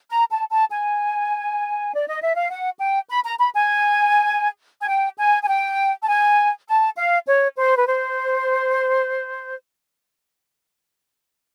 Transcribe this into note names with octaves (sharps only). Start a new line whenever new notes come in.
A#5
A5
A5
G#5
D5
D#5
E5
F5
F#5
G5
B5
A#5
B5
G#5
G#5
G5
G#5
G#5
G5
A5
G#5
A5
F5
C#5
C5
B4
C5